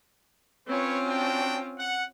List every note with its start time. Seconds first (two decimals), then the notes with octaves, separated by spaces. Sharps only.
0.68 C4 C#4 F4 B4 C#5
1.07 D4 F#4 G5
1.78 F#5